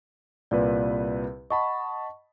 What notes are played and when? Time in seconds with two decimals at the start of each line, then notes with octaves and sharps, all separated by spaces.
0.51 C2 A#2 B4 D5
1.50 D#5 F#5 A5 B5 C#6